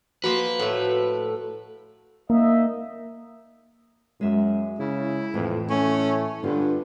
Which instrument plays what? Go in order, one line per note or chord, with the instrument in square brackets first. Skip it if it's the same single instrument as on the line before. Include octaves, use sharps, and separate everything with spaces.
[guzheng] F3 A#3 C5 [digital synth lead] F#4 [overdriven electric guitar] B4
[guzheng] A2 A3 [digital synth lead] F#4
[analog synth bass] A#3 [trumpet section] D#4 D#5 E5
[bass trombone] F#2 [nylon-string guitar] G#3 E5
[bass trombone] C#3 [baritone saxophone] E4
[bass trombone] F2 [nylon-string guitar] A2 E3
[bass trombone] A3 [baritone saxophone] C#4
[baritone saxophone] G2 [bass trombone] D3 [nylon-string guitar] B3 F4 G4